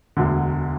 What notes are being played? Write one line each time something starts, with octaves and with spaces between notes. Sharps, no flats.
E1 D2 D3